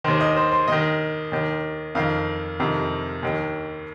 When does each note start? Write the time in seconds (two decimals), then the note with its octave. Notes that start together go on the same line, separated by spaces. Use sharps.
0.04 D#2 D#3 C5
0.21 D#5
0.36 C5
0.52 C5
0.68 D#2 D#3 D#5
1.32 D#2 D#3
1.95 F2 D#3 F5
2.60 F2 C3 D#3
3.23 D#2 D#3